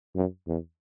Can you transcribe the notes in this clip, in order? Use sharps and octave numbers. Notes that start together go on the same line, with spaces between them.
F#2
E2